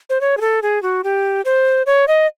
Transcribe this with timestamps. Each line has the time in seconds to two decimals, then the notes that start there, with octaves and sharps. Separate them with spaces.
0.10 C5
0.21 C#5
0.37 G#4
0.41 A4
0.63 G#4
0.83 F#4
1.04 G4
1.45 C5
1.86 C#5
2.08 D#5